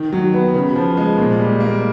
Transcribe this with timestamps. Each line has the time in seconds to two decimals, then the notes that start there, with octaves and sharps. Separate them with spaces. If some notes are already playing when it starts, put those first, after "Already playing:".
Already playing: D#3
0.13 F#3
0.34 B3
0.54 C#3
0.75 F3
0.97 G#3
1.18 A#2
1.39 G3
1.60 A#3